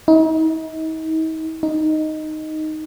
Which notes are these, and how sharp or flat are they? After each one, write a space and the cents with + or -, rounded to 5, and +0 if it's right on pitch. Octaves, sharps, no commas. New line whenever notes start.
D#4 +40
D#4 +0